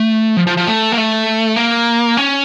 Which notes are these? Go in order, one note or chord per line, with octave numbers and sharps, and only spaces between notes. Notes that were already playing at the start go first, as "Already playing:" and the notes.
Already playing: A3
F3
F3
F3
A3
A#3
A3
A#3
C#4